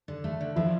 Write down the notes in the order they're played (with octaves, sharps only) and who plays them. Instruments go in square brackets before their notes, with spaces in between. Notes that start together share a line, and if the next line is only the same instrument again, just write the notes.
[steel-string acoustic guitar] D3
A3
D3
[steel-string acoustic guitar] F3 [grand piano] E4